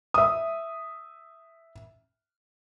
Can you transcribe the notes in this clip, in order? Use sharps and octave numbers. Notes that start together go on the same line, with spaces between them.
E5 D#6